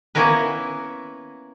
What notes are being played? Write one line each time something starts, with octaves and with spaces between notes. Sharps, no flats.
A#3 B3 C#4 E4 A#4 B4